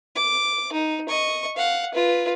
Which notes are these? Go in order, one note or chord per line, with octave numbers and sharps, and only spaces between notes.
D6
D#4
D#5 C#6
F5 F#5
F4 B4